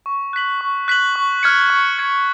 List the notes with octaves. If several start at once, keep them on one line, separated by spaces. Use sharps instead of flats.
C#6
F#6 B6 F#7
C#6
F#6 B6 F#7
C#6
F6 G#6 C#7
C#6
F6 G#6 C#7